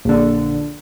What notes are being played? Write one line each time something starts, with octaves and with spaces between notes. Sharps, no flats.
A#1 D3